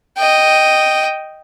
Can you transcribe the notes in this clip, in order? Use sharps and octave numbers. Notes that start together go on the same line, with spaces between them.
D#5 G5